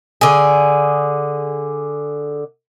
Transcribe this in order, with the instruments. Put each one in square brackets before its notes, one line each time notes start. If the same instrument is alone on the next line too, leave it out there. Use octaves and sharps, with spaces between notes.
[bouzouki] D3 G#4